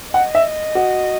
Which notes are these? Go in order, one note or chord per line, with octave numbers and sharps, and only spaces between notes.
D#5 F#5
E5
F#4